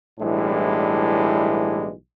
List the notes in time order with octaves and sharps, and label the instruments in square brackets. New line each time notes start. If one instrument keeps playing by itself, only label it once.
[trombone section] B1 A2 E3 G3 G#3 D4